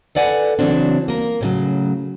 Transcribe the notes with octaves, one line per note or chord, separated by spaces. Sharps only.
A4 B4 D5 F#5 G#5
C#3 E3 F#3 C4 D4
A#3 A#4
A2 C#3 F#3